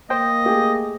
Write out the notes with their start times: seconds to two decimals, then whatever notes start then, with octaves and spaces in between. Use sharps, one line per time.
0.10 A#3 C5 D#5 G5
0.45 A3 G4 G#4